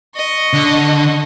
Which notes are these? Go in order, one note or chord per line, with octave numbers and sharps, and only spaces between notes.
D#5 C#6
D3